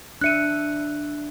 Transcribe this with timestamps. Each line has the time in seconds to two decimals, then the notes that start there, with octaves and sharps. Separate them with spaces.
0.21 D4 E5 F#6 C#7 D#7